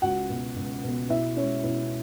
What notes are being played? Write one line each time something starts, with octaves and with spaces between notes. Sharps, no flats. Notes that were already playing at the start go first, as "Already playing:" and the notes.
C#2 F#4 F#5
B2 B3
C#2
B2 B3
B2 E4 E5
G#3 C#4 C#5
B2 E4